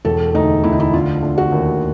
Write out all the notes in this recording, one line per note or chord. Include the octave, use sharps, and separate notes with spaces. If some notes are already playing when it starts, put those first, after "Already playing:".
E1 A4
D2 D#4
D2 E4
D#4
E4
D3 F4
D3
F#4
D#2